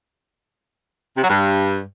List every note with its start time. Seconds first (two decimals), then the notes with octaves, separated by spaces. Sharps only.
1.16 C3
1.22 F#3
1.29 G2